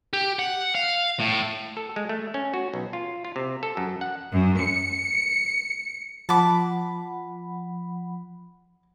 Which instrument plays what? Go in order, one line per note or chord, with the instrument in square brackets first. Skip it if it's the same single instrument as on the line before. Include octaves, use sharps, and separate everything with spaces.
[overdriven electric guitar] G4
F#5
F5
A2
[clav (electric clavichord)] A4
G#3
A3
C#4
F#4
B1
F4
F4
C3
A4
F#2
F#5
[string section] F#2
C#7
[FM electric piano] F3 F#5 B5 [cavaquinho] A5 D6